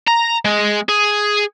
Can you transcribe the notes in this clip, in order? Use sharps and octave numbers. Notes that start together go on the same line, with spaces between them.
A#5
G#3
G#4